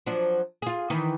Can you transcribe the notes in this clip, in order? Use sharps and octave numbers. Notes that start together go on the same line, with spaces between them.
F3 F#3 D4
F4 G#4
D#3 E3